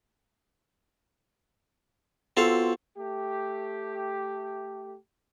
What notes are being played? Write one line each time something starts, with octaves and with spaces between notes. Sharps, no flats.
B3 C4 F4 F#4 A4 F5
A3 G4